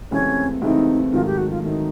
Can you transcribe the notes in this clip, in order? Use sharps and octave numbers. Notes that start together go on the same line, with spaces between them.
C#2 C3 E3 A3 C4 C#4
C#2 C3 E3 A3 C4 D#4
G#2 D#3 F#3 A3 F4
G4
F#4
F4
D#3 F#3 A3 D#4